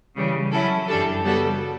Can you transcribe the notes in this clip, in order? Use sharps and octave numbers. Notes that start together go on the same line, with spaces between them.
C#3 E3 G3
F#3 C#4 E4 A4
F#2 E3 G3 D4 A4
C#3 G3 B3 F#4 A4